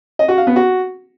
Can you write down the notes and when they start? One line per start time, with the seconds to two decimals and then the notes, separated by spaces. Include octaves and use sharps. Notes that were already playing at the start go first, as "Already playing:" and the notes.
0.19 D#5
0.28 F#4
0.38 F5
0.47 B3
0.56 F#4